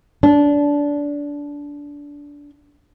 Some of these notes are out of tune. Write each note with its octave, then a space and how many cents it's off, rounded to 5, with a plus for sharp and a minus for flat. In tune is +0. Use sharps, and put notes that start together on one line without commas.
D4 -20